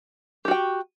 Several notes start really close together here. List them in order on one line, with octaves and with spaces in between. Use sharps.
G4 F#4 G5